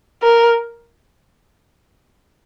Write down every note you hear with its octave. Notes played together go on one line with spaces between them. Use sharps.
A#4